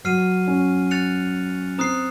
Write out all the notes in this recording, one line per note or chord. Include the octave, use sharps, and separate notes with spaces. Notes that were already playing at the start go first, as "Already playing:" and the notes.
F#3 F6 C7 D#7
C#4
F#6 A6 C#7 F7
C4 A#5 D#6 F#6 C7